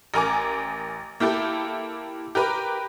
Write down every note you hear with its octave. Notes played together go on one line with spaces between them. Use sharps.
A1 A#4 G#5 D6
A#3 E4 G4 A4
G4 A#4 B4